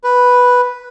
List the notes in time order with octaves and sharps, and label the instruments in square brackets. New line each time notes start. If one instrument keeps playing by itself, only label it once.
[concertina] B4